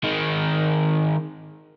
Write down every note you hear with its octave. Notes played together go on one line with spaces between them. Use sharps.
D#3 G#3